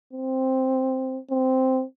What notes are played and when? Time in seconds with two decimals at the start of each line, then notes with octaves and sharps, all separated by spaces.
0.13 C4
1.31 C4